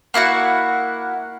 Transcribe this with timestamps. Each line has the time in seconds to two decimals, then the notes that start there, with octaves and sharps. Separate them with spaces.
0.14 A#3 E4 F#4 F#5